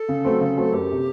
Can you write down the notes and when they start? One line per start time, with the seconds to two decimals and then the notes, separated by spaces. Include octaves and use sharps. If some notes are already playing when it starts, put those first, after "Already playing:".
Already playing: A4
0.09 C#3
0.25 F#3 A3 C4
0.41 C#3
0.57 F#3 A3 C4
0.73 F#1 G4
0.92 C3